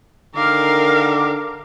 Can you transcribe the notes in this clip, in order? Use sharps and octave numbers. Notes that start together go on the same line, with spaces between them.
D3 D#3 A#4 F5 D6